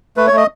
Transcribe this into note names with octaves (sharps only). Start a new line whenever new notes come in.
A3 B4
C#5
A3 D#5